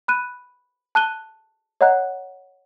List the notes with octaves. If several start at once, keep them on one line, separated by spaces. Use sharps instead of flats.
B5 F#6 D#7
A5 F#6 D#7 G7
C#5 D#5 F#5 A#5 F#6